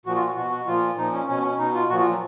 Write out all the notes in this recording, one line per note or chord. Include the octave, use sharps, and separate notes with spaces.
A#2 F3 F#4
F4
F#4
B2 F#4
F#4
A#2 F3 F4
A#2 F3 D#4
C#4
B2 C#4
C#4
B2 D#4
F4
A#2 F3 F#4
F4
F#3